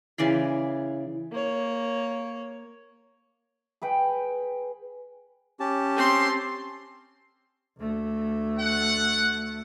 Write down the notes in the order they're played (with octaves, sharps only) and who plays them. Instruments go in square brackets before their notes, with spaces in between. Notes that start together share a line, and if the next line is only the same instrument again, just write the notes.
[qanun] C#3 E3 D5 C6
[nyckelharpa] A#3 C#5
[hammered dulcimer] G#4 B4 G5
[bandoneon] C#4 G4 A5
[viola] C4 C6
[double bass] D2 A3
[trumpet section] F#5